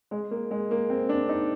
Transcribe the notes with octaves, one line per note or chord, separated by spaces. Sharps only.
G#3
A#3
G#3
A#3
C4
D4
D#4